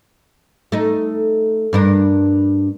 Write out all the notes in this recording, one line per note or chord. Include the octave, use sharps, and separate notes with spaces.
A3 D#4
G2 D4 A#4